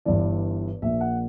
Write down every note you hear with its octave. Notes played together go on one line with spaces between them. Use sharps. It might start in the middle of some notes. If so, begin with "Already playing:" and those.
G1 G2 E3 D5
A#1 A#2 E5
F#5